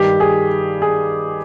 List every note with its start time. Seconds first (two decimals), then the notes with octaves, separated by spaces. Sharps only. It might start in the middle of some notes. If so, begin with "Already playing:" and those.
Already playing: G2 D#3 G3 G4
0.20 G#4
0.82 G#4